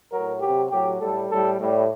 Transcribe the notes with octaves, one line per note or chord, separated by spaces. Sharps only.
A2 F#3 A#4
C3 F#3 G4
A2 F#3 G4
A2 G3 A4
A2 G3 A4
A2 G3